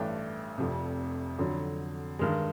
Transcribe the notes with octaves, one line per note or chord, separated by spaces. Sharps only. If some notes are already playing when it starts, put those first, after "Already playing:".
Already playing: A1 G2 E3 A3 D4 G5
F1 F2 C3
F2 D3 F#3
G2 D#3 G#3